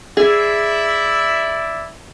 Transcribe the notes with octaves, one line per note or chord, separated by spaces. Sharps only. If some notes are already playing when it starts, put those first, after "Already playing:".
E4 G#4 D5 E5